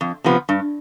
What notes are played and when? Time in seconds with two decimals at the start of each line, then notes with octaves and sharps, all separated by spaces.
0.01 F2
0.24 C3 F3 B3
0.49 G2